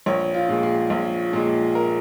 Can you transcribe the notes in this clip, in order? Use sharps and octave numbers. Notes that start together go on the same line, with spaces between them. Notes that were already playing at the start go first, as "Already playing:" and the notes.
A#1 C#5
F4
A#2 G#3
G#4
A#1
A#2 G#3
A#4